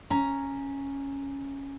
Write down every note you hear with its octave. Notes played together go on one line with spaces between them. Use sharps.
C#4 A#5